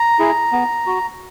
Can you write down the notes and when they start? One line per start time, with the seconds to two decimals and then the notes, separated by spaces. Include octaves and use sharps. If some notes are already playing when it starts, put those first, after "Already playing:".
Already playing: A#5
0.19 E4 G#4
0.52 B3
0.87 F#4